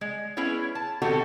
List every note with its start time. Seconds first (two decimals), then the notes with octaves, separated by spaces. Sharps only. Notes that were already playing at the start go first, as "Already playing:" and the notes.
0.01 G#3
0.37 B3 C#4 E4 G#4 C#5
0.75 A5
1.02 B2 D#3 C4 F#4 G4 A4